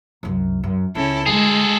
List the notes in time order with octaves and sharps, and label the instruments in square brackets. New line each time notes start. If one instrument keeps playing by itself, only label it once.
[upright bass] C2 F#2
F#2
[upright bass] C#2 [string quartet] C#4 E4 A4
[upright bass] D3 G3 [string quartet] G#3 [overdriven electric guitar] G#4 A4